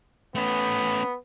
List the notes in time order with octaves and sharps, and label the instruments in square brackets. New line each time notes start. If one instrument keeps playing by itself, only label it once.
[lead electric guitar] A3 C#4 [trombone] B3